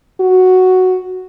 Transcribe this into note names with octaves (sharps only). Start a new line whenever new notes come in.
F#4